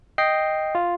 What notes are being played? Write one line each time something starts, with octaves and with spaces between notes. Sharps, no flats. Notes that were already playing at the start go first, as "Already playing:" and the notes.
D#5 G5 C7
F4